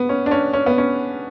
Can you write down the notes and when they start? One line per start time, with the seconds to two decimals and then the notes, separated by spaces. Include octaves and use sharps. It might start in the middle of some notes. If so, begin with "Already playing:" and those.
Already playing: B3
0.09 C#4
0.26 D4
0.31 C#4
0.53 C#4
0.66 B3
0.78 C#4